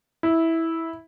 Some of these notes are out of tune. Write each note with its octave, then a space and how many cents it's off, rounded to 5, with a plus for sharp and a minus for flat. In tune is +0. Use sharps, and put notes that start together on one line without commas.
E4 -10